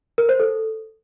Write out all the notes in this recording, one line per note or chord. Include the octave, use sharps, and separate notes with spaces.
A#4
C5
A4